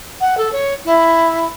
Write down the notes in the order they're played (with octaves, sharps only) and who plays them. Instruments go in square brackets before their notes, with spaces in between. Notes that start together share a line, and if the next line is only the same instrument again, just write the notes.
[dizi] F#5
A4
C#5
E4